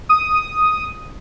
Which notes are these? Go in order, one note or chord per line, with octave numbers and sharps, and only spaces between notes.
D#6